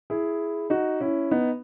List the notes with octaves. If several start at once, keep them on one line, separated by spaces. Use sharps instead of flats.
E4 G#4
D#4 F#4
C#4 E4
B3 D#4